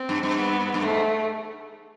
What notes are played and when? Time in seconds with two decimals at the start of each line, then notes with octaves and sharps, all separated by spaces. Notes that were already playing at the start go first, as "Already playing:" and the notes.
Already playing: C4
0.09 G2
0.23 G2
0.38 B3
0.74 G2
0.82 G#2 A3